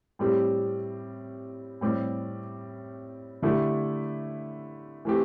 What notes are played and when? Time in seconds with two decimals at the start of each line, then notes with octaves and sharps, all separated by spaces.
0.19 A2 G3 C4 G4
1.81 A2 G3 C4 G4
3.42 D3 A3 E4 G4
5.05 E3 A3 C4 G4